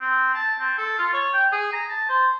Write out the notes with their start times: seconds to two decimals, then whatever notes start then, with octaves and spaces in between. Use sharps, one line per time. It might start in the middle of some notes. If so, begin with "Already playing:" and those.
0.01 C4
0.34 A5
0.59 C4
0.78 A4
0.98 F4
1.13 C#5
1.33 G5
1.52 G#4
1.73 A#5
1.89 A5
2.09 C5